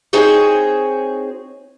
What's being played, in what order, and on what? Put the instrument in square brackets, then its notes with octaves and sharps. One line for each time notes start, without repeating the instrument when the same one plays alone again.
[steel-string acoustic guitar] C4 D#4 F#4 G#4 C5 C#5